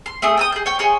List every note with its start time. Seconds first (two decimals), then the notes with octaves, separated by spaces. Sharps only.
0.06 C6
0.22 A3 C4 G#4 D#6
0.37 G5 A5 D#6
0.52 G#4 G6
0.66 C#5 G5
0.79 G#4 C#5 C6